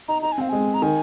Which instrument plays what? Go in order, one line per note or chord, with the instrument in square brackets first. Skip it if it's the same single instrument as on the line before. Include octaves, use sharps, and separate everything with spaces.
[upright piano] D#4 [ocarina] A#5
[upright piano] D#4 [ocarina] A#5
[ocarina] G#5
[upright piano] C4
[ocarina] F5
[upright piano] G#3 [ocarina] G#5
[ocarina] A#5
[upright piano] D#3 [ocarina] G#5